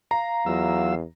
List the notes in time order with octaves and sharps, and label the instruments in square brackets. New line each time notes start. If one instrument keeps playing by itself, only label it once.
[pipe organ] F5 [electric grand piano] A#5
[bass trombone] E2 [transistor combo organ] F#3 F4 E6